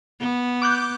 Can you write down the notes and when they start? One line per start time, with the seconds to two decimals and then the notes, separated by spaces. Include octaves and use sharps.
0.20 B3
0.62 D6 F#6 G6